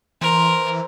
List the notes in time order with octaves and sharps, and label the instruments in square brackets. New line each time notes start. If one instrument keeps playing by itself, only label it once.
[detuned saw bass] E3 [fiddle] A#4 [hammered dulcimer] C5